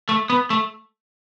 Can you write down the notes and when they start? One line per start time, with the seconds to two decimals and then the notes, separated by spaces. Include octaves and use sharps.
0.09 A3
0.30 B3
0.50 A3